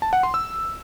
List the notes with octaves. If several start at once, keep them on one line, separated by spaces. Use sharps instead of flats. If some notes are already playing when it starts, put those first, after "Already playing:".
A5
F#5
C6
E6